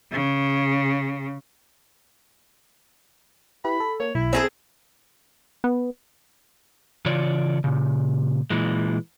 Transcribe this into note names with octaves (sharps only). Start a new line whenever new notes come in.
C#3
E4 G4 B4 B5
A4
A#3 C#5
B1 E4
C4 G#4 A4
B3
C#3 E3 F4 C#5 D5
A#2 C#3
A#2 E3 G#3